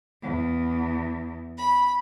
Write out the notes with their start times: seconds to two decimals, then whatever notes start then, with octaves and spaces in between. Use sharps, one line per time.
0.22 E2
1.57 B5